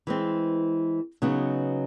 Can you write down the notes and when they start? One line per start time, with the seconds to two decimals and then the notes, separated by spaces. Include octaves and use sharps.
0.07 E3 G#3 C4
1.22 C#3 F#3 B3 D#4